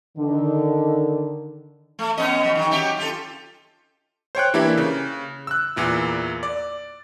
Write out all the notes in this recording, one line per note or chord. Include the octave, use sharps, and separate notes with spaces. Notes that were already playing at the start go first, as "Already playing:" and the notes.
D3 D#3
A3
B3 C#4 D#5
C#3 F#3
D#3
F#3 G4 E5
F4 G4 A4
C5 C#5 G5 F#6
E3 A#3 D4 E4 G4 D5
C#3
E6 F#6
E2 A#2 E4
D5